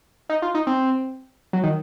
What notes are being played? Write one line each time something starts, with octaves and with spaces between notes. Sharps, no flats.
D#4
F4
D#4
C4
F#3
D#3